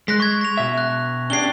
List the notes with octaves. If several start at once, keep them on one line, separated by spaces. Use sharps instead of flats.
G#3 F#6 A#6 B6
C#6 G#6
A#6 F7
B2 E5
F#6
C#4 D4 G4 C7 G7